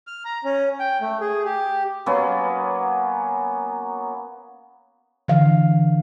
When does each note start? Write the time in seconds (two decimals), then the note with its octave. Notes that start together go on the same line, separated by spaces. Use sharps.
0.07 F6
0.25 A#5
0.44 C#4
0.80 G5
1.01 A3
1.21 G#4
1.45 G4
2.06 F#3 A#3 B3 C#4
5.28 D3 E3 F5